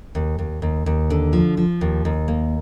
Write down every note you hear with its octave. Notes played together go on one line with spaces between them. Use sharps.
D#2
D#2
D#2
D#2
D3
F3
F3
D#2
D#2
A#3